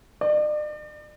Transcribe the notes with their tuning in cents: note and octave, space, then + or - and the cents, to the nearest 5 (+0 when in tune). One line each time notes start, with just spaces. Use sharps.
D5 +40